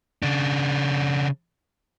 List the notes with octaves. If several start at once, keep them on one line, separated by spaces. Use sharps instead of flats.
C#3 D4